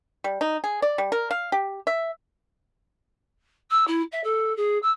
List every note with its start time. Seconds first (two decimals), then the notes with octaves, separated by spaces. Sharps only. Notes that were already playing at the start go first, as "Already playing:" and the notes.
0.24 G3
0.41 D#4
0.64 G#4
0.82 D5
0.98 G3
1.12 A#4
1.31 F5
1.52 G4
1.87 E5
3.70 E6
3.87 E4
4.12 E5
4.23 A4
4.56 G#4
4.82 E6